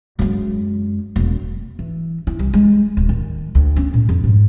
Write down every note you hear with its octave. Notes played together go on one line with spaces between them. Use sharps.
F#2 G#3
E1
E3
E4
C2
G#3
D1
D#3
D2
C#4
A2
F2
G#2